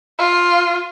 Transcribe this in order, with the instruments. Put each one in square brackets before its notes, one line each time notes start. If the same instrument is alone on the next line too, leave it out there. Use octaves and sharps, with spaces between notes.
[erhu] F4